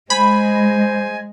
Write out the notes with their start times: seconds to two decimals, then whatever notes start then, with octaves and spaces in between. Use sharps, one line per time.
0.10 G#3 C5 G#5 B5